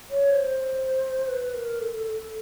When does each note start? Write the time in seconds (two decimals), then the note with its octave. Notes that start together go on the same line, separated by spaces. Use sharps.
0.11 C#5
0.31 C5
1.28 B4
1.54 A#4
1.80 A4
2.07 A4